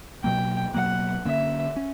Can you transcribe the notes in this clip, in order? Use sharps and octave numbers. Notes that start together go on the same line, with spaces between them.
B2 F#3 A#3 G5
B2 F#3 A#3 F#5
D3 A#3 C#4 E5
C#4